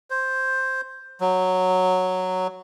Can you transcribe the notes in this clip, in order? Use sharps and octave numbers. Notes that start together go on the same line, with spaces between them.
C5
F#3